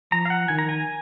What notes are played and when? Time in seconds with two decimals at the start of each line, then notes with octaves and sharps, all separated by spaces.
0.12 F3 A#5
0.25 F5
0.30 F#5
0.48 D#3 G#5
0.59 A#5
0.69 G#5